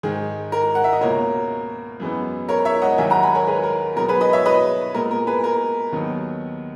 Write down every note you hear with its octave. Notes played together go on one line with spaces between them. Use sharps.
G#2 D#3 G#3 G#4
A#4
F#5
E5
D#5
C#2 B2 A#3 A#4 C#5
F#2 E3 G#3 B3
A#4 C#5
C#5 E5
D#5 F#5
D#2 D#3 F#3 A#3 E5 G#5
F#5 A#5
G#5 B5
A#4 C#5
G#4 B4
A#4
B2 F#3 B3 A#4
G#4 B4
B4 D#5
C#5 E5
B4 D#5
A#2 G#3 B3 A#4
A#4
G#4 B4
A#4
D#2 D#3 F#3 B3